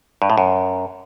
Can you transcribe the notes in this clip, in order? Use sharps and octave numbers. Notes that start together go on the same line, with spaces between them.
G2
A2
F#2